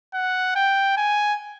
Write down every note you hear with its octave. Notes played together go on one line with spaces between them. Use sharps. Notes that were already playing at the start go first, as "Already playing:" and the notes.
F#5
G5
G#5